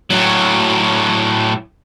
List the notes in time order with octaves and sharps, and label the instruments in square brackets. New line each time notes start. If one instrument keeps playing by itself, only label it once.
[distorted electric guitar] A2 F#3